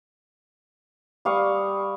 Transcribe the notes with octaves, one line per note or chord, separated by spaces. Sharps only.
G3 F5 C#6 D#6